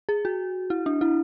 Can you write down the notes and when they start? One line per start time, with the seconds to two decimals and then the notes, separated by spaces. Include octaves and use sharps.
0.09 G#4
0.25 F#4
0.70 E4
0.86 D4
1.01 E4